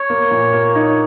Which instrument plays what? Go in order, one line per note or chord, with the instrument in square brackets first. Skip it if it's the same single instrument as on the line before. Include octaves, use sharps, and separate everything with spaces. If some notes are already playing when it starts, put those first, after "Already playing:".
Already playing: [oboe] C#5
[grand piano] A#3
A#2
A#3
[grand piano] D#4 [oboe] C#5